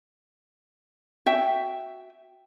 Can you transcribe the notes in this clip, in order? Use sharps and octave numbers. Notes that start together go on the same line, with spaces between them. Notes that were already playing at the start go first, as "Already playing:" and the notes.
F#4 E5 G5